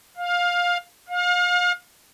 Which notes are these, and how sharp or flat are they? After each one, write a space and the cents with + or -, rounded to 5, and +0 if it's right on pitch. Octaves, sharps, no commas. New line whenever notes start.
F5 +15
F5 +35